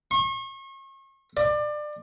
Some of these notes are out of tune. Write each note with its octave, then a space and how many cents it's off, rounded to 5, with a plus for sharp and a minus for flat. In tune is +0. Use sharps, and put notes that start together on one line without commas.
C#6 -40
D5 +25